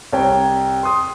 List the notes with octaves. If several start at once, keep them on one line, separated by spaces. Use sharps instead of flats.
C2 C#5 G5
C6 D#6